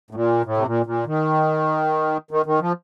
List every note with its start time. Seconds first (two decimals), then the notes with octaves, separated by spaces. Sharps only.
0.11 A2
0.15 A#2
0.45 A2
0.57 C3
0.66 A#2
0.86 A#2
1.06 D#3
2.31 D#3
2.46 D#3
2.61 F3